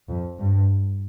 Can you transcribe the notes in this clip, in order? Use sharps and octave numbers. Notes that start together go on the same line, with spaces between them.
F2
G2